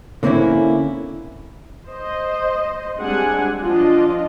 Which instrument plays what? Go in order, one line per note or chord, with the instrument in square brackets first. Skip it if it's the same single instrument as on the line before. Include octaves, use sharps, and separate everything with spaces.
[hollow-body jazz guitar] D3 A#3 C4 C#4 E4
[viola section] C5 D#5
G3 G#3 C4 D4 F#5 G#5
F3 D4 F4 D#5